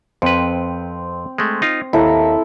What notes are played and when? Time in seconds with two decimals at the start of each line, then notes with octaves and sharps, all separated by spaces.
0.22 F2 C4 B4
1.38 G#3 A3
1.62 D#4 F4
1.93 D#2 E4 A4 A#5